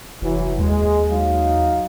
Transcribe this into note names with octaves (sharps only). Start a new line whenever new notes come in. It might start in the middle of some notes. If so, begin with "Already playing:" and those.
F1 E3 F#3
D#2 G#3
F#3 D#4 F5